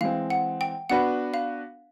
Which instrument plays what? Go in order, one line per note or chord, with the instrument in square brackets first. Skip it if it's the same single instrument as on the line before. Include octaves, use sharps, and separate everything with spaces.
[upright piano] E3 G#3 C4 [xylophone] F5
[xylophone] F#5
G5
[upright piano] B3 D4 F#4 B4 [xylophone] F#5
[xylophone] F5